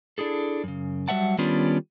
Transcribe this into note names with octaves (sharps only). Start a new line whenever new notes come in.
D4 E4 G#4 A4
F#2 C#3
F#3 G3 C#5 E5 F#5 A5
D#3 G3 B3 C#4 D4 F4